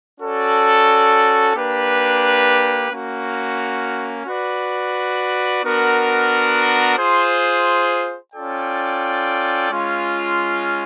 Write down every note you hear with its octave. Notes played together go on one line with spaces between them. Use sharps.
C#4 F#4 A4 D5
A#3 D4 G4 B4
A#3 C#4 F#4
F#4 B4 D5
B3 D4 F#4 A#4
F4 G#4 C5
C#4 F4 A4 D5 G5
G#3 C#4 F4